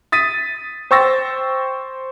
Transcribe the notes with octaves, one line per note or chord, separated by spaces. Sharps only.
D#6 A6 B6 D#7
C5 G5 C#6 E6 A6 A#6